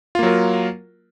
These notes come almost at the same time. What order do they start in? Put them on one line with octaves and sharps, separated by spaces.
F4 A#3 F#3 A#4